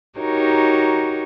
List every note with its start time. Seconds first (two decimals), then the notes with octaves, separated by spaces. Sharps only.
0.19 D#4 F#4 G4 A#4 C#5